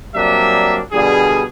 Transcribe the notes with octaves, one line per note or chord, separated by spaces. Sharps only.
F#3 G3 A#3 C4 D4 E5
B2 D3 G3 G#4